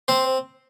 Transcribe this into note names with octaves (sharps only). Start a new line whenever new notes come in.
C4 C5